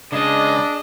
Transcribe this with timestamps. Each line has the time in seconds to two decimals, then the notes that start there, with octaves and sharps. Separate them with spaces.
0.12 C#3 G#3 D4 G#4 D#5